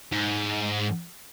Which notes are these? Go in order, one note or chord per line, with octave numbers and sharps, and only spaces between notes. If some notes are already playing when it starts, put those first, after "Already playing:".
G#2